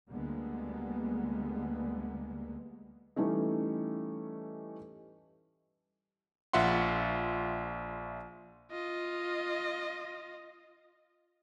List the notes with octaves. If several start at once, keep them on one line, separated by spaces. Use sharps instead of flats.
D2 D3 G3 G#3 A#3 B3
E3 G3 A3 C#4 D#4
A#1 F4 E5 F#5 C6
F4 D#5